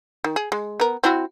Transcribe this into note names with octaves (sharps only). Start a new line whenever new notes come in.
D#3
G#4
G#3
B3 A#4
C4 E4 F#4